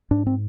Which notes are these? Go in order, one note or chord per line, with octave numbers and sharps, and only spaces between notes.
G#2 D4
C4